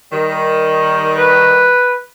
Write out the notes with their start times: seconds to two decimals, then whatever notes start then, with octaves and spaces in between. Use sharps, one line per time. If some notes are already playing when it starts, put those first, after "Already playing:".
0.11 D#3 G3
1.18 B4